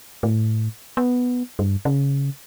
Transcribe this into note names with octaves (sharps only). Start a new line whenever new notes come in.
A2
B3
G2
C#3